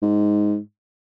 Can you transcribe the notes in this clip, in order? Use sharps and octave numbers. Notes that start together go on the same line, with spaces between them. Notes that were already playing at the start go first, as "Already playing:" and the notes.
G#2